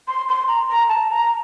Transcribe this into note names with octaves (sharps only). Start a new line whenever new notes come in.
C6
C6
A#5
A#5
A5
A#5